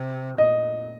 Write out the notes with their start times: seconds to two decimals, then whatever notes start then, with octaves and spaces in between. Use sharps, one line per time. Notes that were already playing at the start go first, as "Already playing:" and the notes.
Already playing: C3
0.38 A#2 D#5